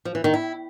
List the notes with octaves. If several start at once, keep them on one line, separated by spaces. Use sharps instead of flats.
F3
E3
D#3
E4